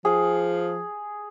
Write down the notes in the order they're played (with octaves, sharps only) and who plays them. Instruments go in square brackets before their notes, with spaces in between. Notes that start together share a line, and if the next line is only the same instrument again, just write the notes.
[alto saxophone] F3 [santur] G#4